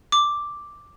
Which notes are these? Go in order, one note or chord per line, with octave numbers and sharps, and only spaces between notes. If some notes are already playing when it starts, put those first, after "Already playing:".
D6